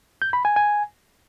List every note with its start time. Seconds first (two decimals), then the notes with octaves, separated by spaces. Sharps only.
0.22 G6
0.33 B5
0.45 G#5
0.56 G#5